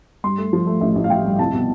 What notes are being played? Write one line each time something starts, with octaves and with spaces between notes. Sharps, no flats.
G2 C6
A3
F3
A3
A1 E5
A1
F5
F3 G5
G2
C2 A5
B2